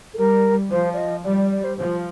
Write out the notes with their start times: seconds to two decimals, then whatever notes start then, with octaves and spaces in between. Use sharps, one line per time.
0.14 A4
0.18 G3 A#4
0.71 F3 C5
0.93 D5
0.97 D#5
1.24 G3 D5
1.37 D5
1.51 D5
1.64 C5
1.78 F3 C5